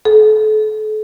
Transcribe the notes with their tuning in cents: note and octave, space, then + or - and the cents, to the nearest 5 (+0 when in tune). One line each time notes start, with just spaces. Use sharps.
A4 -40